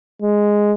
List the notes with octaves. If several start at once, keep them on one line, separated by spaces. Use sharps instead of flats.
G#3